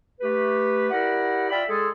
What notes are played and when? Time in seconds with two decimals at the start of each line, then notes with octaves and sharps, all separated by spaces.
0.21 A3 G4 B4
0.91 E4 G4 A#4 D5 F#5
1.50 F4 D5 E5 G5 B5
1.68 G#3 G#4 A4